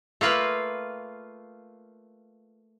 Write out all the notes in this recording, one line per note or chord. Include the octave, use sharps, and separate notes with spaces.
A3 A#3 F4 B4